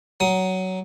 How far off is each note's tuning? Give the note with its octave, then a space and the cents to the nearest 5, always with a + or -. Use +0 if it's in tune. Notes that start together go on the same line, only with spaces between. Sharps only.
F#3 +15 D#6 +20